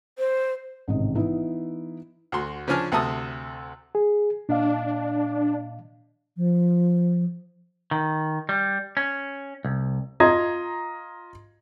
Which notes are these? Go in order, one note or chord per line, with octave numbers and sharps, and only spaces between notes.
C5
A1 G#2 C3 D#3 D#5
E3 B3 D#4 E4
D2 F#4 C6
C#3 F3 C#4 D4 G#5 F6
D2 C3 A3 E5 A5 D#6
G#4
A#2 D4 D#5 F5
F3
D#3
G3
C#4
C2
F4 D#5 A#5 C6 G#6